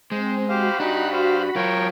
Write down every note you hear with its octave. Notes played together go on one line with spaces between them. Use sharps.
G#3 C4 C5
F#4 G4 C5 F5 B5
D4 D#4 G4 F#6
C5 F5
F#3 F4 A#4 C#5 G5